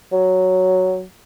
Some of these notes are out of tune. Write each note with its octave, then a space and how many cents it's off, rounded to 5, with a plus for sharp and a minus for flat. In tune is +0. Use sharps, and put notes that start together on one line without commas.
F#3 +5